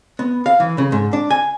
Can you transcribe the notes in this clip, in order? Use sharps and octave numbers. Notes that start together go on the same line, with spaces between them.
B3
F5
E3
C#3
G#2
D4
G#5